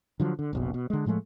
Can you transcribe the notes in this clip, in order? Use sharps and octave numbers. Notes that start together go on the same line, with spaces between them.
D3 F3 F#3
D3
F1 A#1 B2
B2
D3 G#3
A2 F3 G#3 A3